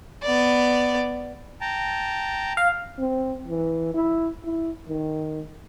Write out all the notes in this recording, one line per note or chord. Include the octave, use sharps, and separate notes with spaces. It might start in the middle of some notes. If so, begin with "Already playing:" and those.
B3 D5
G5 A5 A#5
F5
C4
E3
E4
E4
D#3